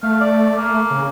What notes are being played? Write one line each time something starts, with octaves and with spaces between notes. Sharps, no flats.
A3 F5
D5
A#3
C#3